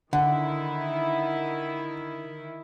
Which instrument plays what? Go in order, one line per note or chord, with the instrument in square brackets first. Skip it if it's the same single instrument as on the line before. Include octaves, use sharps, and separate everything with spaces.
[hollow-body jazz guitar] D3 [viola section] D#3 E4 [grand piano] F#5